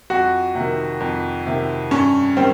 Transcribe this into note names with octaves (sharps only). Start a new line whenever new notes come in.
F2 F#4
C3
D#3
F2
C3 D#3
G2 C#4
D#3 G3 C4